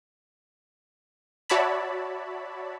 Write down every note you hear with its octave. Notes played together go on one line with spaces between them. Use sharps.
F#4 C#5 D5 E5 A5 B5